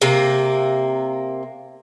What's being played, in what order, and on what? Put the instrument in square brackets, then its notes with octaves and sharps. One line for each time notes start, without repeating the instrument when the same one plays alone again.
[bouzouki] C3 A#3